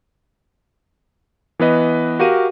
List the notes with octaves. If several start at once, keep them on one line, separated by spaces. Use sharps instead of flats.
E3 B3 B4 D#5
F#4 G4 A#4 F5 D#7